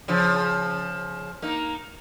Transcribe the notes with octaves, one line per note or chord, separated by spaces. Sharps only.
C#3 F3
A#3 D#4